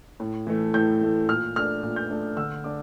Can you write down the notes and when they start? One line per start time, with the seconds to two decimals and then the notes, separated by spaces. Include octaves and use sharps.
0.20 A2
0.47 E3 A3
0.74 A2 G6
1.01 E3 A3
1.29 A#2 F6
1.56 A3 D4 F6
1.83 A#2
1.96 G6
2.10 A3 D4
2.37 D3 E6
2.64 A3 D4 D6